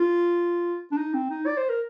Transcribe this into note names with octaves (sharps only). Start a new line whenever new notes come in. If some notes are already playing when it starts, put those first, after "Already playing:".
Already playing: F4
D4
D#4
C4
D#4
D5
C5
A#4